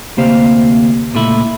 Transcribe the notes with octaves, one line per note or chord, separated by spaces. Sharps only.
D2 C3 A#3 G4 C5 F5
C#2 A#2 A3 E4